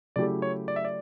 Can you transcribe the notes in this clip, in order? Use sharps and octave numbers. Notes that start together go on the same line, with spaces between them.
C#3 F#3 A3 E4 G4 D5
C#5
D5
E5
D5